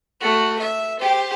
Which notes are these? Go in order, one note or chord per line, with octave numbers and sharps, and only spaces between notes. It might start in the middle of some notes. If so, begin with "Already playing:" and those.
A3 F#4
E5
G4 C5